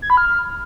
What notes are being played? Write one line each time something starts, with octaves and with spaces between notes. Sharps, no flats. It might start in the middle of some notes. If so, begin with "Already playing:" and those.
G#6
B5
F6